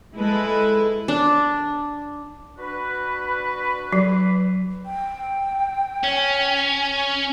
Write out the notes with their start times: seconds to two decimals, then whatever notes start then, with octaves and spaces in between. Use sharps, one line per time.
0.16 G#3 E4 A4 B4
1.08 D4
2.58 D4 F#4 B4
3.93 F#3
4.86 G5
6.04 C#4